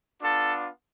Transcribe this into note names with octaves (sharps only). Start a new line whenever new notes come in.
B3 D4 F4 A4